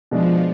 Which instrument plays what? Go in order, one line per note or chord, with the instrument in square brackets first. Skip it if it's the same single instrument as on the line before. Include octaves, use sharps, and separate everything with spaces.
[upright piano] B2 G#3 D4 [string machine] F3